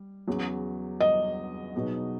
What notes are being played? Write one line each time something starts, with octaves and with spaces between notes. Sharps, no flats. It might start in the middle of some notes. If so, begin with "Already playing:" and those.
Already playing: G3
E2 C#3 F#3
D#5
B2 F#3 B3 D#4 G#4